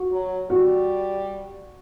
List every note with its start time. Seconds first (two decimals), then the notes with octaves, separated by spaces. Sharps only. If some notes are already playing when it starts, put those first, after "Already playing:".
Already playing: F#4
0.12 F#3
0.50 G3 F#4